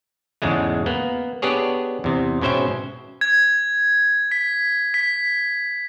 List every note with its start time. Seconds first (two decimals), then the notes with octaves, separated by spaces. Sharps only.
0.42 E2 G#2 C#3 G#3 A3
0.86 A#3 B3
1.42 B3 D4 G4 G#4 C#5
2.04 E2 C3
2.41 G#2 B2 C#4 C5 E5 G5
3.21 G#6
4.31 B6
4.94 B6